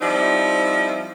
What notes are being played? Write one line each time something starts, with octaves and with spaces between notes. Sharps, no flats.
F3 G3 C4 D#4 E4